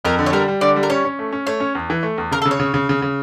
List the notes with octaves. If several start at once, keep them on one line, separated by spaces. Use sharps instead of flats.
F2 A#4
D3
C#5
G3 A#4
G3
D3 D5
G3
A#4
C#4 C#5
C#4
A3
C#4
A3 C#5
C#4
E2
E3
A3
E2
C#3 A#4
A4
C#3
C#5
C#3
C#3
C#3
C#3